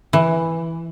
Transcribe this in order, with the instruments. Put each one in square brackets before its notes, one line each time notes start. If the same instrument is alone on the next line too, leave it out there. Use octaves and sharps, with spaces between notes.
[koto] E3